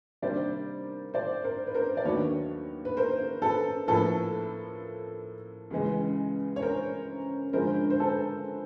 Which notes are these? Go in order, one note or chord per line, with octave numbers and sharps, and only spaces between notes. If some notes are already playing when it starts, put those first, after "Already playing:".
C3 D#3 G3 A#3 D4 C5 D5
C5 D5
A#4 C5
B4
A#4 C5
D5
D#2 D#3 F#3 A3 D4 B4 C#5
B4
A#4 C5
A4 B4
A2 F3 A#3 A4 B4
C#2 C#3 E3 G#3
C#5
A#4 C5
G2 D3 F3 G#3 A#4 C5
C5
A4 B4